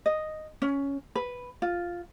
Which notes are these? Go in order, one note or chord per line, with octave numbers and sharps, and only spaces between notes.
D#5
C#4
B4
F4